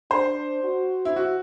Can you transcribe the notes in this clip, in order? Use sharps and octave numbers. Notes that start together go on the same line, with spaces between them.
D4 C5
F#4
E4
F#4